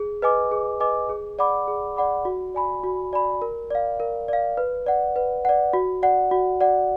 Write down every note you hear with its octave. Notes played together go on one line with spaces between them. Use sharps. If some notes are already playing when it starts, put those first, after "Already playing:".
Already playing: G#4
B4 D#5 G#5 D6
G#4
B4 D#5 G#5 D6
G#4
D5 F#5 B5 D6
G#4
D5 F#5 B5 D6
F#4
D5 G#5 B5
F#4
D5 G#5 B5
A#4
D5 F5
A#4
D5 F5
B4
D5 F#5
B4
D5 F#5
F#4
D5 F#5
F#4
D5 F#5